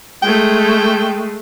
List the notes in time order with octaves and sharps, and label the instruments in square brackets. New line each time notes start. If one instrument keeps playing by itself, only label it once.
[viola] G#3 A3 [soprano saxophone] G5